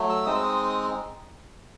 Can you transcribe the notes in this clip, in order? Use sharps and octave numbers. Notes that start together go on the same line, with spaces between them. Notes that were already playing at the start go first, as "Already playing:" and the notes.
Already playing: F#3 A3
E6
G#3 C4 D#4 D#6
E6
D#6